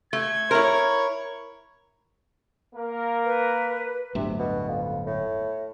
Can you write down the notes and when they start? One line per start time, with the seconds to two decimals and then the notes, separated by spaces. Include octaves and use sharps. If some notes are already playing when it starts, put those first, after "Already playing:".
0.13 A3 G#6
0.51 E4 A#4 C#5
2.74 A#3 A#4
3.25 B4
4.15 D1 G1 D2 C3
4.39 B2
4.68 F2
5.06 A2